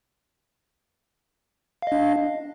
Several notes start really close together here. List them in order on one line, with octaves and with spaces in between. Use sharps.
F5 D#5 D4